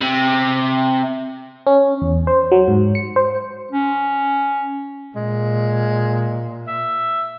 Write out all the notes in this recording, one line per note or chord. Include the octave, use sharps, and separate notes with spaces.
C3
C#4
E2
C5
F#3
G#2
C#7
C5
C#4
A#2 G#3
E5